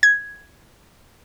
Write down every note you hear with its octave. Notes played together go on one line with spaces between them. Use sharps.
G#6